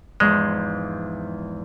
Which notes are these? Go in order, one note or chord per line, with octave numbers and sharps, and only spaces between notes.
E2 G#2 F3 G#3